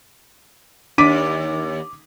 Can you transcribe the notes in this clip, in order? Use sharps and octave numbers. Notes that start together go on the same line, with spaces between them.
D#2 D4 D6 B6 D#7